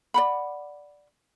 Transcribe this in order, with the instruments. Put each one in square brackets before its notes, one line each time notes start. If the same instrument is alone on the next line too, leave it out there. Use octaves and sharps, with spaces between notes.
[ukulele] D5 F#5 B5